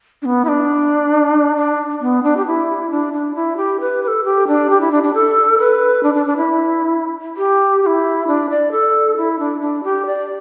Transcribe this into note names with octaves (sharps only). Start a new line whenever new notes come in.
D4
B3
E4
D4
D4
B3
D4
G4
E4
D4
D4
E4
G4
B4
B4
A4
G4
D4
G4
E4
D4
D4
A4
B4
D4
D4
D4
E4
G4
G4
E4
D4
D5
A4
E4
D4
D4
G4
D5